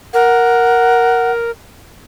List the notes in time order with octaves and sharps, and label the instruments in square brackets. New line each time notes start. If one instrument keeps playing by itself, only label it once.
[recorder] A#4 [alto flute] F#5